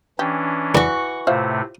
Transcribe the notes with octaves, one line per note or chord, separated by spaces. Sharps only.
E3 C#4 D4 G4
E2 E3 D4 F#4 C#6
A2 C3 A3 F4 C5 E5